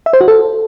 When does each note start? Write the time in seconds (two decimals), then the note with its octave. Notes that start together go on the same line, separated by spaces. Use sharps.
0.06 E5
0.13 C5
0.21 F#4
0.28 A4